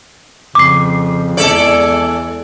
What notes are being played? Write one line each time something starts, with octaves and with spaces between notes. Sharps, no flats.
F2 C#3 D6 C7
E2 E3 G#3 A4 D5